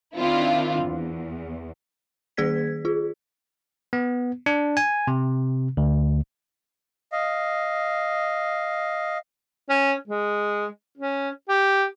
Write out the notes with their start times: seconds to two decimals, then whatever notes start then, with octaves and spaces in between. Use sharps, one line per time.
0.16 D#3 C4 D4 E4 F4
0.84 E2
2.37 D#3 A#3 G#4 D5 G#6 B6
2.85 F4 G#4
3.93 B3
4.46 D4
4.77 G#5
5.07 C3
5.77 D2
7.12 D#5 F5
9.69 C#4
10.07 G#3
10.98 C#4
11.49 G4